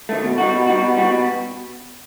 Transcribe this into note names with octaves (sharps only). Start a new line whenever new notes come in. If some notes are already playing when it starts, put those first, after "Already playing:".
D#3 A3
B2
G3 D#4 F#4
B2
G3 D#4 F#4
B2
G3 D#4 F#4
B2